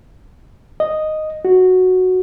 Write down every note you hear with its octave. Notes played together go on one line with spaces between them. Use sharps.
D#5
F#4